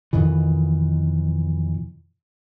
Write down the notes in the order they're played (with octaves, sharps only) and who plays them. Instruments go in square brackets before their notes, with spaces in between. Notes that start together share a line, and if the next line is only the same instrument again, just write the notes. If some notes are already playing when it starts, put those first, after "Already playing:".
[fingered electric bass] F2 B2 D#3 E3